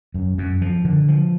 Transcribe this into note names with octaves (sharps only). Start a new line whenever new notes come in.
F#2
F#2
F3
D3
F3